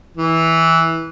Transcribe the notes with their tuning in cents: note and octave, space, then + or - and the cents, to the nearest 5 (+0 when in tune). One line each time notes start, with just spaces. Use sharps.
E3 -10